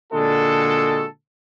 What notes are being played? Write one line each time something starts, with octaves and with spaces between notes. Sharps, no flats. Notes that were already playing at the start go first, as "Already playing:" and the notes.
A#2 D3 G#3 F#4 A4